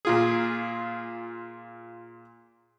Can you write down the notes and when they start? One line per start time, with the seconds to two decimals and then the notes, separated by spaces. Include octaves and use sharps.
0.05 A#2 F4 G#4